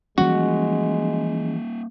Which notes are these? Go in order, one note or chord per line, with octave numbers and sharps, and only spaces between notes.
E3 F3 G3 G#3 A#3 C#4 F#4